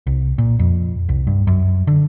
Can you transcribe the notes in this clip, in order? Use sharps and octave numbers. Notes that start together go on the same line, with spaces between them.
C2
A#2
F2
C2
G2
F#2
D3